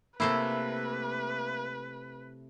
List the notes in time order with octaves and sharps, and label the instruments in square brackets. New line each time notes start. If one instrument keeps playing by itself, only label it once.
[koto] C3 A3 E4 [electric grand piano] A#3 E5 C7 [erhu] B4